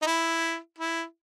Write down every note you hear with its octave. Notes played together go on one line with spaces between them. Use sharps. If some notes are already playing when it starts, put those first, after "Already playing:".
D#4
E4
E4